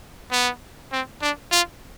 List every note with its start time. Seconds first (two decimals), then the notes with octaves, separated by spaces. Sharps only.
0.31 B3
0.92 C4
1.21 D4
1.52 F4